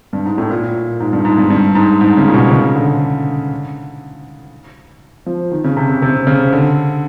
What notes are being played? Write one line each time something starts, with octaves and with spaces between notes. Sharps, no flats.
G2
G#2
A2
A#2
G#2
G2
G#2
G2
G2
G#2
G#2
C#3
A#2
B2
C#3
D3
F3
D#3
C#3
C3
C3
C3
C#3
D3